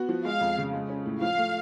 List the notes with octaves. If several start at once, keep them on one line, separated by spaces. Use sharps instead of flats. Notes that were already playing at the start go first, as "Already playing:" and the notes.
Already playing: B3 F#4
F3
G#3 F5
F2
C#3
G#3
C#4
A2
F3 F5
A3